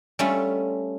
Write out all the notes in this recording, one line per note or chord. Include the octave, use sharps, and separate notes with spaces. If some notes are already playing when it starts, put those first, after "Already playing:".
G3 A3 C#4 F4